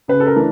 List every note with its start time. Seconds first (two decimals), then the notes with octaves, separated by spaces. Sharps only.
0.08 C#3 B4
0.20 A4
0.27 A#4
0.36 E3 A3 D4